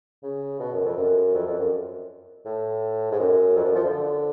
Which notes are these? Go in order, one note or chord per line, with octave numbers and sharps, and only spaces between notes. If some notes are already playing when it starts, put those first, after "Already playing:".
C#3
B2
F#2
F2
F#2
F2
F2
F#2
A2
G#2
F#2
F2
F#2
F3
D3